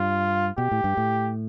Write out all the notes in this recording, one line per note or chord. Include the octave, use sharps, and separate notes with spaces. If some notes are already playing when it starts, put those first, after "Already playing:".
Already playing: G2 F4
B2 G4
A2
G2
A2